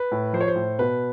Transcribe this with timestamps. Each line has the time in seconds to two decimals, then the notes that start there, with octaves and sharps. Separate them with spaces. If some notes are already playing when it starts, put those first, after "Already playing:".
Already playing: B4
0.11 A2
0.33 F3 C5
0.41 C#5
0.48 C5
0.55 A2
0.79 B2 B4